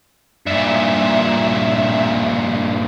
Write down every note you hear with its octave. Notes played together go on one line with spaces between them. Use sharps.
G2 A#2 E5